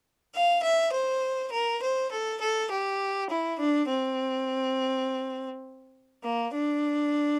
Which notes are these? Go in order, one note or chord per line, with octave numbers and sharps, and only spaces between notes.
F5
E5
C5
A#4
C5
A4
A4
G4
E4
D4
C4
A#3
D4